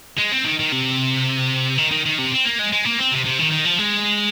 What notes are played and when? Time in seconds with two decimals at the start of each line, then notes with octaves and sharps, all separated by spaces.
0.19 G#3
0.32 C4
0.45 D#3
0.59 D#3
0.72 C3
1.78 D#3
1.91 D#3
2.06 D#3
2.19 C3
2.32 C4
2.45 A#3
2.59 G#3
2.72 G#3
2.85 A#3
2.99 C4
3.11 C3
3.25 C3
3.39 D#3
3.51 D#3
3.65 F3
3.78 G#3